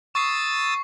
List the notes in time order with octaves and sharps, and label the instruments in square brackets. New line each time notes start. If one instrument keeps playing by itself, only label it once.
[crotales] C#6 C7 [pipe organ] D#6 E6 A6